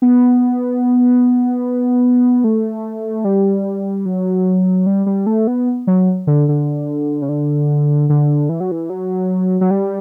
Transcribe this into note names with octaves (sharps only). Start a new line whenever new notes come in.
B3
A3
G3
F#3
G3
G3
A3
B3
F#3
D3
D3
C#3
D3
D3
E3
F#3
E3
F#3
F#3
G3